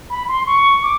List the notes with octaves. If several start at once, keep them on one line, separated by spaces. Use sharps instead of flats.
B5
C6
C#6
D6